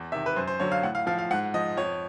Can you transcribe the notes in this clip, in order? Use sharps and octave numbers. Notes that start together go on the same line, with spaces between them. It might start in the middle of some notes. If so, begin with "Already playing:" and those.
Already playing: E2
C3 D#3 E5
B4
F#2 C5
C5
D3 F#3 C#5
F5
A2 F#5
F5
F3 F5
F5
G#2 F#5
F3 D#5
F2 C#5